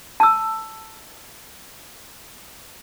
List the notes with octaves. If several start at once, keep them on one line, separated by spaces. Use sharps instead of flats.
A5 E6